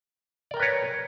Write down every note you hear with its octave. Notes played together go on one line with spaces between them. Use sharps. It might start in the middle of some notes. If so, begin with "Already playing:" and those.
A#4 B4 C#5 D5 G5